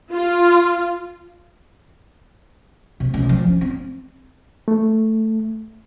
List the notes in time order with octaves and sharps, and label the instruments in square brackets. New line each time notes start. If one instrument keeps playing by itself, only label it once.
[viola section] F4
[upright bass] C3
C#2
F3
C#4
C4
[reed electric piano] A3